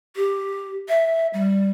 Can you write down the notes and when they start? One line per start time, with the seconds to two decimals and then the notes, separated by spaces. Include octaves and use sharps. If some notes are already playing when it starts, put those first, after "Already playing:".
0.16 G4
0.88 E5
1.34 G3